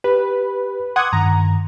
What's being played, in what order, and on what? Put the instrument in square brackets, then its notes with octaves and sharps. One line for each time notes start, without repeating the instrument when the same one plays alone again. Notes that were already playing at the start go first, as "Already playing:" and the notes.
[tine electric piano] G4 [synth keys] B4
[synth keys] F#5 D#6 G#6 [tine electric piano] C6 D6
[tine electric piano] G2 D#3 [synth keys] A#5